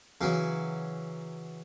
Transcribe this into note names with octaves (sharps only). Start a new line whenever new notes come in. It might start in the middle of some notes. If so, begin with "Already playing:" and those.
C#3 E3 F#3